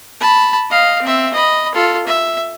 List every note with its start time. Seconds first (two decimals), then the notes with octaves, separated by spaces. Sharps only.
0.21 A5 B5
0.70 D#5 F5
1.02 C4 E5
1.33 D#5 B5
1.74 F4 A4
2.07 E5